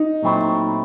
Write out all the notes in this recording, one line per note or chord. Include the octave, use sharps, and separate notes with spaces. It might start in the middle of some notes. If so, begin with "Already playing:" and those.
Already playing: D#4
A#2 F#3 A3 C4 E4